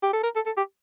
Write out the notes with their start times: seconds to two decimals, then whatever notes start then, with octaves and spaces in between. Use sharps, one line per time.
0.03 G4
0.13 A4
0.23 A#4
0.35 A4
0.46 A4
0.57 G4